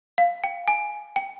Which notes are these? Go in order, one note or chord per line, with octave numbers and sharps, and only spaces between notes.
F5
G5
G#5
G5